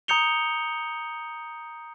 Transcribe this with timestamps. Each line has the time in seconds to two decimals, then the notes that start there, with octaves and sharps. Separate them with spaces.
0.08 A#5 D#6 G6 C#7 F7 G7